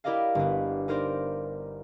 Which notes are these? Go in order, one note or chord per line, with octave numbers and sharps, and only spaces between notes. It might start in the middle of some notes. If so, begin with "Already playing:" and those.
E4 G4 A#4 D5 D#5 F5
G1 B3
D#4 A#4 C5 D5